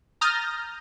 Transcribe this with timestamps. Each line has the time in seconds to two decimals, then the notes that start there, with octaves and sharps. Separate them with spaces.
0.21 A#5 D#6 F6 G6 A6 A#6